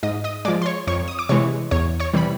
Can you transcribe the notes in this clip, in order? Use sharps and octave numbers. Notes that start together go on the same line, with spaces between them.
G#2 D#5 D#6
D#5 D#6
F3 G#3 D5 D6
C6
C#5 C#6
F2 C#5 C#6
D#6
D6
C3 E3 G#3 C#5 C#6
E2 C#5 C#6
C#5 C#6
C3 E3 G3 B5